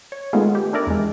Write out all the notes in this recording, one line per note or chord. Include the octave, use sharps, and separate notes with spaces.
C#5
D#3 G#3 A3 B3 F4
G4
D4 E4 A#4 D5
E2 G#3